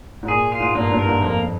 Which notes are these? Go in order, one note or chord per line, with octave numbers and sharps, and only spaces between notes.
G#2
A#2 G#4
F4
G#2
G2 A#3
G2
A#4
G#2
F2 A#3